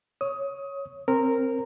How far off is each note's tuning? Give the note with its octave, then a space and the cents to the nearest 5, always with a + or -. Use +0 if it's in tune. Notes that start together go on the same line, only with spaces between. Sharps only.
C#5 +0 D#6 +20
C4 +15 A#4 -10